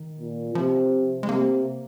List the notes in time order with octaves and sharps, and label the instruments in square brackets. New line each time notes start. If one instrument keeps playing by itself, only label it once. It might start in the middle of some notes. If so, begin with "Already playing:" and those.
Already playing: [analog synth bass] D#3
[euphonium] A#2
[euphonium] C3 [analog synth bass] F3
[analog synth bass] G#3
[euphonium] C3 [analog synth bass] A#3